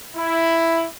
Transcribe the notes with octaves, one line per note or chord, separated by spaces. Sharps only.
E4